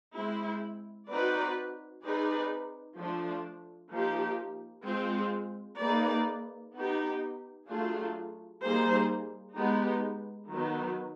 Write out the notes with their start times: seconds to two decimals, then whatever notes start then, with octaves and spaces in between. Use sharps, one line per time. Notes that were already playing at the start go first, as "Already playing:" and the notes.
0.15 G#3 C4 E4
1.09 C4 D#4 F#4 B4 D5
2.03 C4 D#4 G#4 B4 D5
2.97 F3 A3 D4
3.91 F3 A#3 D#4 G4
4.86 G#3 C4 F4
5.80 A#3 D#4 G#4 B4 D5
6.74 B3 D#4 G4
7.69 F#3 A3 D4 F4 G#4
8.63 G3 A#3 D#4 G#4 C5
9.56 G#3 B3 D#4 G4
10.50 D#3 F#3 B3